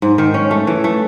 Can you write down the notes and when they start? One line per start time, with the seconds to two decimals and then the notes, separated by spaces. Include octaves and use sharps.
0.02 G#2
0.18 D#3
0.34 C#4
0.51 A3
0.67 E3
0.84 A3